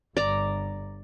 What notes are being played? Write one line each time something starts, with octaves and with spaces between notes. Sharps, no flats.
G1 D5 A#5